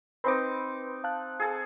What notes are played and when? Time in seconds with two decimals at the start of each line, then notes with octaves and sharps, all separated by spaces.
0.24 C4 D#4 B4 B5 C6 D6
1.04 F5 A5 F#6
1.40 G#4 A4